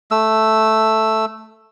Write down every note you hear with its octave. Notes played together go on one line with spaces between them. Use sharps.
A3 E6